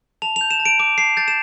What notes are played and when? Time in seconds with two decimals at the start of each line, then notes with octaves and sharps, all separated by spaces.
0.22 A5 F7
0.36 G6 F7
0.51 E7
0.60 A5
0.65 D7
0.80 D6 D7
0.98 A5 C7
1.17 G6 A6
1.28 E7